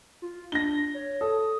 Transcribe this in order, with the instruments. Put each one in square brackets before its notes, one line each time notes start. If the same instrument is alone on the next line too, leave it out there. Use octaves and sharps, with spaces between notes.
[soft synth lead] F4
[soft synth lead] D4 [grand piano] A#6 G7
[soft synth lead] C#5
[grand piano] A4 [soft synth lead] D#6